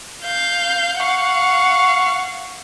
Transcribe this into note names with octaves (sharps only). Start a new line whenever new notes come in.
F5 G6
F5 F#5 C#6